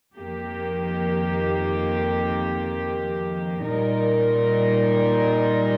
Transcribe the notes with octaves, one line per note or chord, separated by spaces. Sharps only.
F2 D#3 A#3 G4
A#2 G3 D#4 A#4